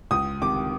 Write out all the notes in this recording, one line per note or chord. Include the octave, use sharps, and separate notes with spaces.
C#2 D#6
C3 D#3 D6